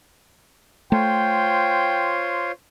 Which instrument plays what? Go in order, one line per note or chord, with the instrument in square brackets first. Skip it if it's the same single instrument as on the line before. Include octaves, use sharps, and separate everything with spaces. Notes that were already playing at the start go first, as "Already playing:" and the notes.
[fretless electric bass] A3 [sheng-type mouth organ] F4 C5 C#5 [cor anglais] G5